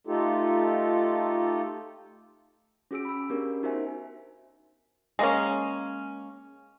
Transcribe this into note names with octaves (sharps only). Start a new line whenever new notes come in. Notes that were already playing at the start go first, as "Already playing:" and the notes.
A3 D#4 F4 G4 A4
C#4 F#4 G#4 E6 D7
B5 E6
B3 C#4 D4 G4 A#4
D#4 F#4 A#4 C5 E5 G#5
G#3 A#3 C#4